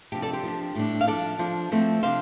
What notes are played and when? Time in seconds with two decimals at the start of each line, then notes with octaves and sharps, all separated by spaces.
0.12 C3 F3 D4 G4
0.22 A4 D5
0.33 G4 C5
0.43 F3 D4
0.75 A2 G3 D4
1.01 F5
1.07 F3 D4 A4 D5
1.39 F3 D4
1.71 F3 A3 C4
2.03 C3 F3 D4 C5 F5